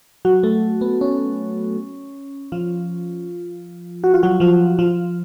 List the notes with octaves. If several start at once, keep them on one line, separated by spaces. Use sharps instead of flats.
F#3 F#4
A3 A4
B3
C#4
F3 F4
F#4
F4
F#3 F#4
F3 F4
F3 F4